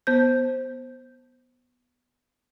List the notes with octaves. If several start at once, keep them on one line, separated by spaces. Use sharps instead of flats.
B3 C5 G6